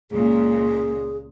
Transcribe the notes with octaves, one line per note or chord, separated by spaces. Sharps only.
C#2 A#2 G#4